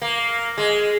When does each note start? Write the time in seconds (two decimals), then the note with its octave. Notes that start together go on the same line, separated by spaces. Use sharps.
0.02 A#3
0.58 G#3